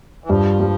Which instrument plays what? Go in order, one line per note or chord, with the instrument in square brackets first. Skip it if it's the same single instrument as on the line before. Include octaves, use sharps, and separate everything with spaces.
[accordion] E3
[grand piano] G2 [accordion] F3
[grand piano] G3